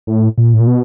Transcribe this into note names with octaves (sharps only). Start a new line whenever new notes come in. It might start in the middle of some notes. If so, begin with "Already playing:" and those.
A2
A#2
A2
A#2
B2